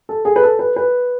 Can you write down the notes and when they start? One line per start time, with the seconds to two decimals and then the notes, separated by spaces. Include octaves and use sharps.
0.09 A4
0.25 G#4
0.36 B4
0.43 A4
0.59 B4
0.76 B4